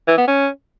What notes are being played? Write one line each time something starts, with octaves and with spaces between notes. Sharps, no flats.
E3
B3
C#4